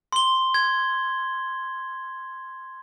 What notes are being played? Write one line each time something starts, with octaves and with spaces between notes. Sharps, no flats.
C6 G7
G#6